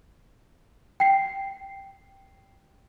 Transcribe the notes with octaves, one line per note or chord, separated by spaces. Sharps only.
G5 C7